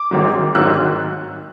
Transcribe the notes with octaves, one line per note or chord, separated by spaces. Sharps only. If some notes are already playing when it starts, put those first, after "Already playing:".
Already playing: D6
G#1 G#2 D#3 F#3
G#1 G#2 D#3 F#3 E6 F#6